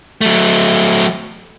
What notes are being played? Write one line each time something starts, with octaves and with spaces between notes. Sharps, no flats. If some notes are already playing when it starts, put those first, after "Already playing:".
F#3 A3